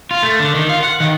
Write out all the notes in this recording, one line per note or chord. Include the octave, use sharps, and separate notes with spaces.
F4
A3
D3
D#3
F4
F#5
D#3